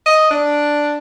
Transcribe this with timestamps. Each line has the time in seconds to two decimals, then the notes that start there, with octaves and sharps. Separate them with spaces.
0.06 D#5
0.30 D4